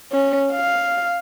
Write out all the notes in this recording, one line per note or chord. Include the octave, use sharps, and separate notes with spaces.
C#4
F5